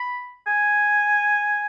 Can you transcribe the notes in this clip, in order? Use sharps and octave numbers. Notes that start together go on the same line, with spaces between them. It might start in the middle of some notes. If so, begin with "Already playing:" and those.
Already playing: B5
G#5